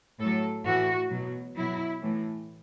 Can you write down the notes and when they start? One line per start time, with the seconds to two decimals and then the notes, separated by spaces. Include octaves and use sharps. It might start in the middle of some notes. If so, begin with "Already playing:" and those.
0.20 A2 F#3 A4
0.65 A2 E3 F#4
1.10 B2 F#3
1.56 B2 F#3 E4
2.01 A2 E3